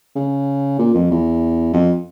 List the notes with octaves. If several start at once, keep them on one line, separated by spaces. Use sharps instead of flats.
C#3
A#2
F2
E2
F2